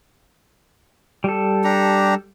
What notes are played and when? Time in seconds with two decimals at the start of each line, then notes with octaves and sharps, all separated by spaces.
1.24 G3 A4
1.64 D4 G4 A#5